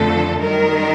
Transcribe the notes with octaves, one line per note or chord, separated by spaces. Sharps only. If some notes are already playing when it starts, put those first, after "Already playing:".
Already playing: F2 D3 F3 A3 A4
F#2 D#3 G3 A#4